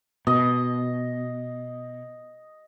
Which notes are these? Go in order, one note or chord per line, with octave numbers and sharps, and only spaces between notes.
B2 D#5